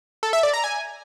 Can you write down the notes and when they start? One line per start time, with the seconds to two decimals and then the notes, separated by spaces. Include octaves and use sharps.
0.23 A4
0.33 E5
0.43 D5
0.54 A#5
0.64 G#5